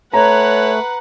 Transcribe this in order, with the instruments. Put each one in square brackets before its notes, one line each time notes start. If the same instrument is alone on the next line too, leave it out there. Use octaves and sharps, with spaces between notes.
[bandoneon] A3 [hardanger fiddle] B4 F#5 [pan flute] C#5 [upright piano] A#5